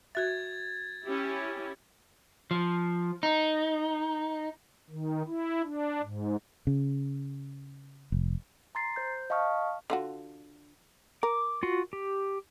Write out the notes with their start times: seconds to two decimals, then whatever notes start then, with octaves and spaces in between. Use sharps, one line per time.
0.15 F#4 E5 G#6 A6
1.05 C#4 E4 G4
2.51 F3
3.23 D#4
4.90 D#3
5.27 E4
5.63 D4
6.02 G#2
6.67 C#3
8.12 F1
8.75 A#5 C6 A6 C7
8.96 C5 G6
9.30 D#5 F5 A5 C#6 D#6 F6
9.90 D3 F4 F#4
11.23 A#4 D6
11.63 F4 F#4
11.93 G4